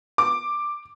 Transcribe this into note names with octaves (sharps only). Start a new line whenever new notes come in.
D6